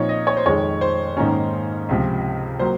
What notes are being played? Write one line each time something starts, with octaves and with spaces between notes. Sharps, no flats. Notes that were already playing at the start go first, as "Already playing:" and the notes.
Already playing: A#2 F3 C4 D#4 C#5
D#5
C#5
C5
F2 D#3 G#3 C#5
C5
G#2 D#3 A#3 C#4
C#2 C3 F3
F#3 A#3 C5